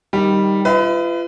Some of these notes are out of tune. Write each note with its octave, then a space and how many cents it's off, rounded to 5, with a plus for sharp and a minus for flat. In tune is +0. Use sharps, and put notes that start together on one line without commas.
D#3 +0 G3 +0
F4 -30 B4 +30 D#5 +40